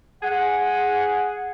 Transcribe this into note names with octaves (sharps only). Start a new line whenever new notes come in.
G#4 F#5